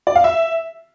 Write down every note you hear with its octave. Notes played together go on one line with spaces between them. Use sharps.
D5
F5
E5